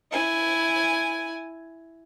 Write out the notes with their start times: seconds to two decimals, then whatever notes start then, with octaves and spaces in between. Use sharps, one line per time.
0.12 E4 G#5